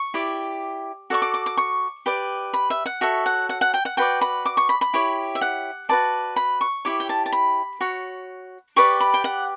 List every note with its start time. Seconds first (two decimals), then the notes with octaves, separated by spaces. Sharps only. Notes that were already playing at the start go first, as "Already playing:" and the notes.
Already playing: C#6
0.14 E4 G4 D5
1.10 F#4 A4 D5 C#6
1.22 D6
1.34 D6
1.46 D6
1.57 C#6
2.06 G4 B4 D5
2.53 B5
2.70 E5
2.86 F#5
3.01 F#4 A4 C#5 E5
3.26 F#5
3.49 F#5
3.61 F#5
3.74 G5
3.85 F#5
3.97 F#4 B4 D5 G5
4.21 B5
4.46 D6
4.57 C#6
4.69 B5
4.81 B5
4.94 E4 G4 C#5
5.35 E5
5.41 F#5
5.89 F#4 B4 D5 A5
6.36 B5
6.61 C#6
6.85 E4 G4 C#5 D6
7.00 G5
7.09 A5
7.26 A5
7.32 B5
7.81 F#4 C#5
8.76 G4 B4 D5 C#6
9.00 B5
9.14 G5
9.24 F#5